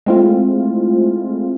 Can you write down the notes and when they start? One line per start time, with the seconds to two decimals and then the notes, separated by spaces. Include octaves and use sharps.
0.06 G#3 A3 C4 E4 F4